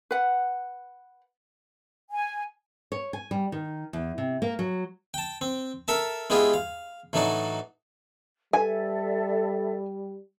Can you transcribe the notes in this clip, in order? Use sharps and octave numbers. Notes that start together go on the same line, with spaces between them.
B4 F#5
G#5
C#5
G#5
G3
D#3
E2
C3
A#3
F#3
G5 A5
C4
A4 A#4 E5 A5
G#3 B3 E4 F4 G4 G#4
F5
A2 E3 F#3 D4 D#4 F#4
G3 A4 B4 D5 E5 G#5